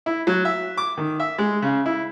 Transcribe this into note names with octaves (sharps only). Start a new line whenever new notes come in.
E4
F#3
E5
D6
D#3
E5
G#3
C#3
E4